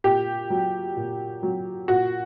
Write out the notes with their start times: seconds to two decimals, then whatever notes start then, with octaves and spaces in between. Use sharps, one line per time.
0.04 A#2 G4
0.50 F#3
0.97 A#2
1.43 F#3
1.88 A#2 F#4